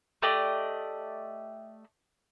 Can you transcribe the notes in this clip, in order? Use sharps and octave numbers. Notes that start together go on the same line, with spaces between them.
A3 G4 D5 D#5